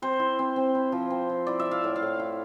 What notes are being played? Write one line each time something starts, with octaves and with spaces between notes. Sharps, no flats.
C4 C5
E4
C4
C4
E4
F3
C4
F3
E4 D5
E5
E4
F5
A2
F5
A2
E4